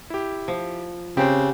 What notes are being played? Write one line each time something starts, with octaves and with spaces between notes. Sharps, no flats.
E4 G4
F3
C#3 C4 G4 C5